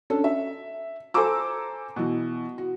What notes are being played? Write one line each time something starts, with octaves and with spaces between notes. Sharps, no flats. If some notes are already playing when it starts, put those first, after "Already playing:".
C#4 D4 A4
E5
A4 C5 G#5 A#5 D6 E6
B2 E3
F#4